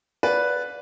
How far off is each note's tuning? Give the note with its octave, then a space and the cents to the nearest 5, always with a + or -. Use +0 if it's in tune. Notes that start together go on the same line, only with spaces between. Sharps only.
B4 +0 D5 -20 F5 +45